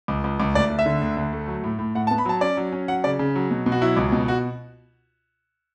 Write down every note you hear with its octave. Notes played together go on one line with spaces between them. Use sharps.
C#2
C#2
C#2
D2 D5
D2
E5
D3
D2
D2
A3
F#3
A2
A2
A2 F#5
A5
B3
B5
F#3 A5
C#4 D5
F#3
C#4
F#3 F#5
C#3 D5
C#3
F#3
B2
B2
F#4
F#3 E4
C#2
B2
F#4